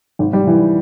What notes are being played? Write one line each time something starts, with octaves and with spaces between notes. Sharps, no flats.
G#1
G3
E3